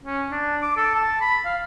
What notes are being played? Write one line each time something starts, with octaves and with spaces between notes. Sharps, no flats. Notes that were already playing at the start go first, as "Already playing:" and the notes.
C#4
D4
D6
A4
A5
B5
F5